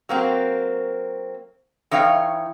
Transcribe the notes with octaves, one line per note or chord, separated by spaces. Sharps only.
F#3 A#3 C4
E3 D#4 C#5 F5 G5